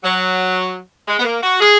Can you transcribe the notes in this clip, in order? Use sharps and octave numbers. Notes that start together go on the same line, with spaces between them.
F#3
G#3
B3
A#3
F#4
G#4